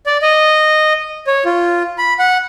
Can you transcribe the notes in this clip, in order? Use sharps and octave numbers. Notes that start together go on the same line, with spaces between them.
D5
D#5
C#5
F4
B5
F#5